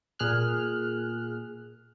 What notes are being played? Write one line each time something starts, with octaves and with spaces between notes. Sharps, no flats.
A#2 G#4 F6 F#6